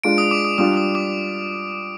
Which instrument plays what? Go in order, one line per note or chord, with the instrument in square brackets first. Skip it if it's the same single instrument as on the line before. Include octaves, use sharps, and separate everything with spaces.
[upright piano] G#3 D4 F4 [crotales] D7
[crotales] D#6
D6
D#6
[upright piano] G3 D4 F4 [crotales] D#6
[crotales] D#6
D6